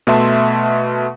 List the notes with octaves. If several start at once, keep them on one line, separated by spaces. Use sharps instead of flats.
B2 A3 B4 E5 A5 C6